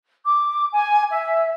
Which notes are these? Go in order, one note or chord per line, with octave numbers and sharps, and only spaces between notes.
D6
G#5
E5